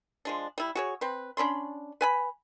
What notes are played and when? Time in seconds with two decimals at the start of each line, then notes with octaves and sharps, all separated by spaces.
0.25 F3 G#3 D4
0.58 G3 E4
0.75 F#4 G#4 C#5
1.01 C4 B4
1.37 C#4 D4 B5 C6
2.01 B4 G#5 B5